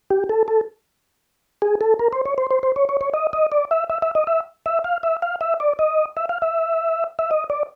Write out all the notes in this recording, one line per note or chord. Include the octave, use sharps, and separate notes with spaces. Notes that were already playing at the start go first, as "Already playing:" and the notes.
G4
A4
A4
G#4
A4
A#4
C5
C#5
C5
C5
C5
C#5
C#5
C#5
D#5
D#5
D5
E5
E5
E5
D#5
E5
E5
F5
E5
F5
E5
D5
D#5
E5
F5
E5
E5
D#5
D5